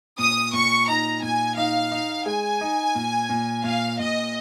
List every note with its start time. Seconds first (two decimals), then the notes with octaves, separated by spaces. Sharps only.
0.19 A#2 D#6
0.53 A#2 C#6
0.88 D#4 A#5
1.22 A#2 G#5
1.57 D#4 F5
1.92 D#4
2.26 G#3 G#5
2.61 D#4
2.95 A#2
3.30 A#2
3.64 A#2 F5
3.99 A#2 D#5